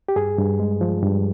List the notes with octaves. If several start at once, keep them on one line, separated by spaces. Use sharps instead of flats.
G4
G2 G#4
G2
G#3
F3
G2